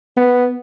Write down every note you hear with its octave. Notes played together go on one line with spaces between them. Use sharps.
B3